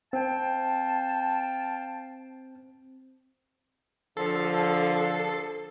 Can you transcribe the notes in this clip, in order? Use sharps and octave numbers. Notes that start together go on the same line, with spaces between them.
C4 F5 G5 A5
D3 F3 A4 C7